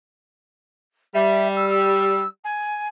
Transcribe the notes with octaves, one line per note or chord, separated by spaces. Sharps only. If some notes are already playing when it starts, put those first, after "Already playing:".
G3 E5
E6
E6
G#5